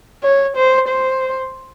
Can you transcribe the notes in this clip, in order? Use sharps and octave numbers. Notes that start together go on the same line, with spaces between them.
C#5
C5
C5